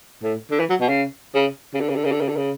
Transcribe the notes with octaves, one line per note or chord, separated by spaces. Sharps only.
A2
D3
E3
F#3
B2
C#3
C#3
C#3
D3
C#3
D3
C#3
D3
C#3
D3
C#3